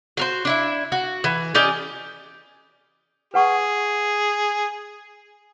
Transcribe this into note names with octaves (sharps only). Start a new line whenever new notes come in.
F#4 A#4 C5
D4 E4 E5
F#4
E3
C#4 G4 D5 D#5
G#4 B4 F#5 C#6